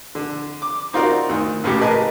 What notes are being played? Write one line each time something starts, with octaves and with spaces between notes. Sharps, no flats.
D3
D6
C4 D#4 F4 F#4 A#4 D5
D2 D#3
C#2 A2 C#3 G4
G#4 A#4 B4 D#5 A5